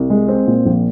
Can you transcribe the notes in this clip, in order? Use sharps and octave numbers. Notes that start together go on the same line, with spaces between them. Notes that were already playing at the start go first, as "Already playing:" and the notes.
Already playing: C2
G#3
C4
A#2
A#1